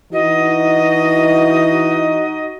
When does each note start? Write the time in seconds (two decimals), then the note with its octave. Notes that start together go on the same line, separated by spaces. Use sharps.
0.12 E3 D#4 F#4 D#5